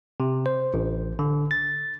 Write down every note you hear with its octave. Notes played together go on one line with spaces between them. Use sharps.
C3
C5
A1
D3
A6